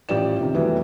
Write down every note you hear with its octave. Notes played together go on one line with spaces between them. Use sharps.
A1 F3 G4 D5 E7
C3 D#3
F2 E3 F#3 G3 A3 B3